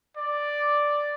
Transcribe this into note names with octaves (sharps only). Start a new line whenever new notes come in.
D5